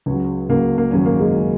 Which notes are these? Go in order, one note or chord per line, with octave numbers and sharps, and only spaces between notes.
C#2 C#3 F#3 C#4
C#2 C#3 F#3 A#3
A#3
G#1 F#2 C#3 C#4
A#3
G#3
C#3